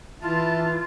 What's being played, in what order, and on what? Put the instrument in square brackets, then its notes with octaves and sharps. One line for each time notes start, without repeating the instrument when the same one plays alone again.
[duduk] E3 [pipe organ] E4 A5 [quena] F4